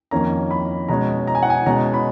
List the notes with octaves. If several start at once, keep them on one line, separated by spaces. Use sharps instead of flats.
F2 D#3 A#3 C#4 A#5
B5
B2 G#3 C#4 A#5
A#5
G#5
F#5
G#5
B2 G#3 C#4 A#5
B5